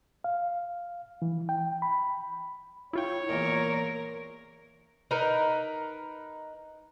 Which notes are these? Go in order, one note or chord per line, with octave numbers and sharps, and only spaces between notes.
F5
E3
G5
B5
E4 F4 C#5 G5
E2 A#2 A#3 A#4
D#4 A#4 B4